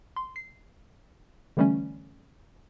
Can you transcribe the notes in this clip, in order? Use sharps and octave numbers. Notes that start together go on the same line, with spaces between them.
C6
C7
D3 E3 G3 A3 C#4